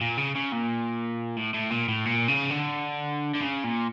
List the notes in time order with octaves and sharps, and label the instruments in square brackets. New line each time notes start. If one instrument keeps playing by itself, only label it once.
[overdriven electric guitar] A#2
C#3
C#3
A#2
A2
A2
A#2
A2
A#2
C#3
D3
D3
C#3
A#2